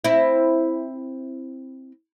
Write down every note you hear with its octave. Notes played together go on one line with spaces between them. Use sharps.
C4 E4